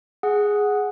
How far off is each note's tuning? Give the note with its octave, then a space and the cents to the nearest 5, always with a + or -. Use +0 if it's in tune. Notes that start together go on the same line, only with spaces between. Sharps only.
G#4 +0 F#5 +0